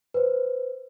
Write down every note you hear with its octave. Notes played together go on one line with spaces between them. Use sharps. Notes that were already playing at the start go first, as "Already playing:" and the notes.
B4 C5